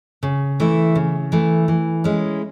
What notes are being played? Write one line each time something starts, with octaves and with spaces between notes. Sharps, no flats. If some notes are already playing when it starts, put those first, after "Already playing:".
C#3
E3 A3 E4
C#3
E3 A3
E3
G#3 C#4 E4